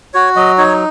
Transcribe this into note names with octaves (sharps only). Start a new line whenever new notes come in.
F#4 C#5
F#3 D#5
D#4 C#5